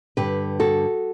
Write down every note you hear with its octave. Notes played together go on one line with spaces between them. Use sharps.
G2 D3 G4 B4
F#4 A4